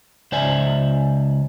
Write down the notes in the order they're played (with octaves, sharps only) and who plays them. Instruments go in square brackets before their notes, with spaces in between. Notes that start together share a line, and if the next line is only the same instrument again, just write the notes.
[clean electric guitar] C#2 C5 D5 E5 G#5